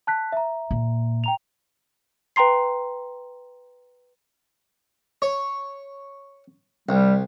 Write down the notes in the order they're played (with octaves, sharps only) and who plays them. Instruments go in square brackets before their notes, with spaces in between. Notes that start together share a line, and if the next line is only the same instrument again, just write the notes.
[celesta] A5 F#6 B6
E5 A#5
[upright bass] A#2
[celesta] G5 A#5 F7
[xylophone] B4 G5 A#5 C6 C7
[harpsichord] C#5
[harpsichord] C2 [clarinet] G3